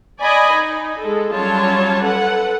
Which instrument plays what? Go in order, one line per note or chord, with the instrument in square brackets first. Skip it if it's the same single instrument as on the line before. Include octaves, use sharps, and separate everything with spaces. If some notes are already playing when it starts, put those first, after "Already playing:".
[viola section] D5 D#5 G#5 B5
D#4
G#3 A4
F#3 G3 C#4 F4 C#5 A5
A4 B4 F#5